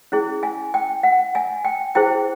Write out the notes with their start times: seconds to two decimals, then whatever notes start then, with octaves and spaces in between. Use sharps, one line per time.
0.12 C#4 E4 G#4
0.43 G#5
0.74 G5
1.03 F#5
1.35 G#5
1.65 G5
1.95 E4 G#4 C5 G5